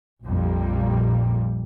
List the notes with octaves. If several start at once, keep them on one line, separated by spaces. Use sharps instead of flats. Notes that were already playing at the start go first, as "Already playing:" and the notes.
A#1 F2 A#2 G3 A#3